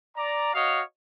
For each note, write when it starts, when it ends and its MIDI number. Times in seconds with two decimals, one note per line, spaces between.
0.16 0.52 74
0.16 0.52 82
0.53 0.81 66
0.53 0.81 73
0.53 0.81 75
0.53 0.81 77